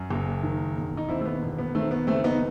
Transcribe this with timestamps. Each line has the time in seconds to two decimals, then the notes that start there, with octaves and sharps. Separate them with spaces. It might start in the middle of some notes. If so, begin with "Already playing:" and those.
Already playing: F#2
0.10 F#1
0.43 D#3
0.77 E1
0.97 D#4
1.09 D#2 C4 E4
1.21 A3
1.25 B3
1.42 E1
1.58 B3
1.75 D#3 A3 C4
1.91 B3
2.07 F#1 A3 C4
2.24 B3 D#4